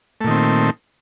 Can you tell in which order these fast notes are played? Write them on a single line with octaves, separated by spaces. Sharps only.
A3 A#2 D#3 C4